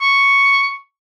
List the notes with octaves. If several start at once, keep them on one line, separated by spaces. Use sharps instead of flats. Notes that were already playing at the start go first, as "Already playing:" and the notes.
C#6